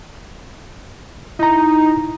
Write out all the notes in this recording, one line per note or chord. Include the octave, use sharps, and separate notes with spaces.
D#4 E4 A#5